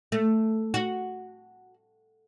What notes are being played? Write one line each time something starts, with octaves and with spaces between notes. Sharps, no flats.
A3
F#4